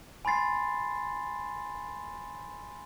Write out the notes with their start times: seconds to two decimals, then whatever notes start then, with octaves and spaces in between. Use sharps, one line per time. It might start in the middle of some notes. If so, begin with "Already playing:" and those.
0.25 G#5 B5 C6 A6 C7